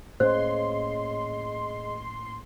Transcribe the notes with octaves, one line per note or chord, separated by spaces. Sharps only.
A2 A#3 C#4 G#4 C5 D#5 C6